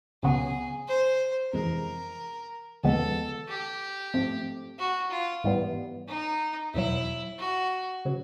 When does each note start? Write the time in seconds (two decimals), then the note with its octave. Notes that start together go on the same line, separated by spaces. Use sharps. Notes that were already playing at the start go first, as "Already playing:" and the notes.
0.23 C#2 C#3 F#3 B3 G#4
0.88 C5
1.53 F2 C3 E3 G#3 A#4
2.83 D#2 C#3 F3 G#3 B3 A4
3.48 G4
4.14 G#2 F3 A3 C4
4.78 F#4
5.11 F4
5.44 G#2 E3 G3 B3
6.09 D#4
6.74 E2 B2 F#3 E4
7.39 F#4
8.05 C#3 F#3